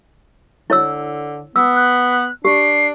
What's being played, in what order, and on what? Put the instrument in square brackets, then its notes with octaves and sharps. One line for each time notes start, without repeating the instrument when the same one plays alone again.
[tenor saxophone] D3 [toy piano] E4 C#5 E6
[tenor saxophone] B3 [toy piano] E6
[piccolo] F#6
[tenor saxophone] D4 [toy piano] G4 [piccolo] C7